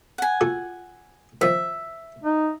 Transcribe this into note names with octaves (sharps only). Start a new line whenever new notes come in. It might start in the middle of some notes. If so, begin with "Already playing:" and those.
F#5 G#5
F4 F#4 A4
D#3 F3 E5
D#4